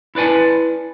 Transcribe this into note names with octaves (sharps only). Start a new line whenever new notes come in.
E4 B4 D5 G#5 A5